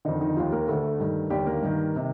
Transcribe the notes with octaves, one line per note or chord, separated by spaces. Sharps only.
F2 D3 D#3 D#4
D#3 D#4
D#2 D#3 F3 F4
A#3 A#4
D2 D3 A3 A4
G2 D#3
D#2 D3 G3 G4
A#3
G2 D#3
C3 D#3